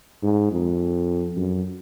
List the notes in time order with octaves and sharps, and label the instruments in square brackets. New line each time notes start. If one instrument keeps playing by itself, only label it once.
[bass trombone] G#2
F2
F#2